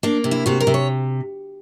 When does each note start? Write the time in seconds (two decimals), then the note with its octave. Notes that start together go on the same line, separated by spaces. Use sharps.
0.03 A#3 D4
0.24 C3
0.31 E4
0.46 C3 F#4
0.60 A#4
0.67 C3
0.74 C#5